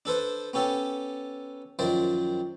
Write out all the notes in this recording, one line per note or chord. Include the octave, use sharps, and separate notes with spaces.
D4 A4 B4 C5
B3 C#4 G4 A4
F#2 D#3 F3 C5 D5